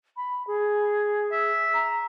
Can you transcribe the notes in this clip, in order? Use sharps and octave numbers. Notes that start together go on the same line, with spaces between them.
B5
G#4
E5
A#5